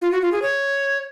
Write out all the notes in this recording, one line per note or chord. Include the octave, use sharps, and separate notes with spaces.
F4
F#4
F4
G#4
C#5